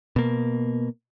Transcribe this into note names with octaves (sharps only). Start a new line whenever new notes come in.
B2 A#3